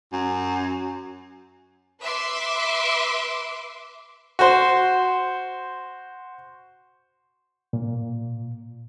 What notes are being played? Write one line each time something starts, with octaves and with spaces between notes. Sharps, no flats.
F#2
B4 E5 C6 D6
F#4 C5
A#2